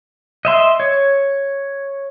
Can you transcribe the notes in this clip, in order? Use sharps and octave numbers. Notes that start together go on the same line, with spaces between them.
D#5 E5 C6
C#5